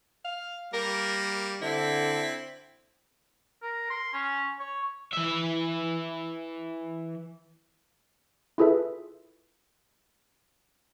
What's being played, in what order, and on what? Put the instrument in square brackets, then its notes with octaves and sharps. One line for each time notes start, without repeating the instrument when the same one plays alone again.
[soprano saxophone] F5
[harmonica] G3 A#3 [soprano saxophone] A#4
[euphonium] D3 [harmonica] C4 [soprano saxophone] E4
[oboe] A#4
C6
C#4
C#5
[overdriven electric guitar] E3 E5
[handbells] E4 F4 G#4 A4 B4 E5